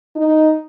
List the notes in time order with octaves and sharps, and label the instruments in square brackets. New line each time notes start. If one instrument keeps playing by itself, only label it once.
[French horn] D#4